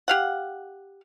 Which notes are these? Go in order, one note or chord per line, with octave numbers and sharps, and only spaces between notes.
G4 F5 F#5